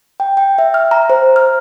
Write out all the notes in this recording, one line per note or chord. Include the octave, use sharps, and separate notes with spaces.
G5
G5
E5
F6
A#5
C5
F6